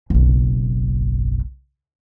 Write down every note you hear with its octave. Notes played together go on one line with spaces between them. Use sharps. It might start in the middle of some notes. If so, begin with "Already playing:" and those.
F#1 B1